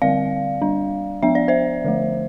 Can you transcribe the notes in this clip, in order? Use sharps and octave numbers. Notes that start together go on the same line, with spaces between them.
D3 G3 C4 D5 F5
G3 D4
F3 B3 D4 E5
D5
C5 E5
D3 F3 A3